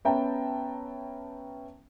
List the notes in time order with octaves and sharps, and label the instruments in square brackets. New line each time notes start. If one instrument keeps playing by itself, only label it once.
[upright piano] B3 C#4 E5 G5 A5 A#5